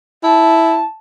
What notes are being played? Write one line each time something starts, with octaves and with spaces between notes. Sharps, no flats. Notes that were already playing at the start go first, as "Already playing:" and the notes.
E4 A5